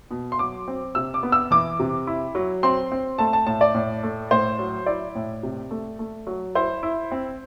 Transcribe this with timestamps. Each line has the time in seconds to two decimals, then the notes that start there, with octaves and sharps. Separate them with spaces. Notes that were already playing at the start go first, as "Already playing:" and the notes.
0.11 B2
0.32 C6
0.39 F#3 D6
0.68 C4
0.95 C3 E6
1.14 D6
1.23 B3
1.32 E6
1.51 E3 D6
1.80 C3
2.07 E4
2.35 F#3
2.63 C4 C6
2.92 C4
3.18 A3 A5
3.33 A5
3.46 A2 A5
3.61 D5
3.75 A2
4.03 A3
4.31 A2 C5
4.59 F#3
4.86 E4 D5
5.15 A2
5.43 C3
5.71 A3
5.99 A3
6.27 F#3
6.55 E4 C5
6.83 E4
7.12 C4